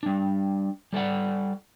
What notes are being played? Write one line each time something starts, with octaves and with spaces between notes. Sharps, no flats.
G3 D4
G3 A4 D5 F#5